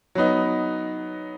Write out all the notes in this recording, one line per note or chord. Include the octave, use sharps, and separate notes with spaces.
F#3 B3 D#4